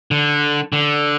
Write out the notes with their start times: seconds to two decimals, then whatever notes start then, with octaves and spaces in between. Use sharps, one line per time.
0.11 D3
0.73 D3